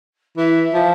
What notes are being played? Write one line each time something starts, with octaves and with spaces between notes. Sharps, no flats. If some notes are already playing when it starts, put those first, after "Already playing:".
E3 E5
F3